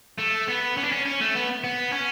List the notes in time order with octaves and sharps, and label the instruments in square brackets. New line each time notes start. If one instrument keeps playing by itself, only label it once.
[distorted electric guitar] A3
B3
C#4
D4
C#4
C#4
A3
B3
B3
C#4